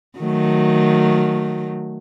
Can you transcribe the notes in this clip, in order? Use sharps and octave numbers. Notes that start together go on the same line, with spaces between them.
D#3 F#3 A3